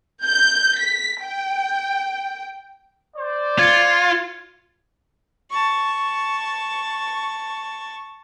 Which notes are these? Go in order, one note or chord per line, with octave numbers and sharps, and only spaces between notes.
G6
B6
G5
C5 D5
F4 G#6 A6 C#7
A5 C#6